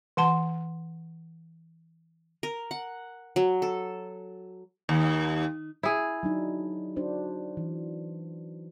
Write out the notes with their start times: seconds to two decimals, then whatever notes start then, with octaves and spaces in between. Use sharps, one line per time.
0.17 E3 F#5 A5 C6
2.43 A#4
2.71 F#5
3.36 F#3
3.62 A4
4.89 D#2
5.83 E4 G#4
6.23 F#3 D4 D#4
6.96 D4 F#4 C5
7.57 E3